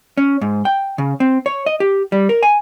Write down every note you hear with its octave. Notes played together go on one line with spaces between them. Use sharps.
C#4
G#2
G5
C#3
C4
C#5
D#5
G4
G3
A#4
G#5